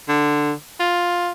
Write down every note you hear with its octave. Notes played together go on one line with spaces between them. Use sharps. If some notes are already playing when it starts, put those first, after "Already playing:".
D3
F4